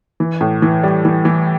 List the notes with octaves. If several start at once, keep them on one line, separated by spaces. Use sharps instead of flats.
E3
A2
E3
G3
E3
E3